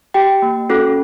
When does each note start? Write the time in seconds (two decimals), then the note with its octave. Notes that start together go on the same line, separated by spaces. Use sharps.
0.14 G4 G5
0.42 A#3
0.70 C#4 F#4 A4